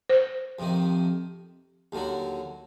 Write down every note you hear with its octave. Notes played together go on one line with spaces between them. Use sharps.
C5
F2 C3 D#3
D#2 D3 F#3